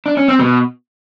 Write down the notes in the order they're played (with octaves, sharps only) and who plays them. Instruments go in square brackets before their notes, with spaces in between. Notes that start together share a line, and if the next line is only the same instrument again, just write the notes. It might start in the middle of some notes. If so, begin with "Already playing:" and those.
[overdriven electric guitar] D4
C#4
C4
B2